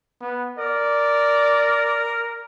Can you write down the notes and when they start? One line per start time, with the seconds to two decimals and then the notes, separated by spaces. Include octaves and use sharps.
0.21 B3
0.58 A#4 D5